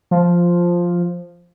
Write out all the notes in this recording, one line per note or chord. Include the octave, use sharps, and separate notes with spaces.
F3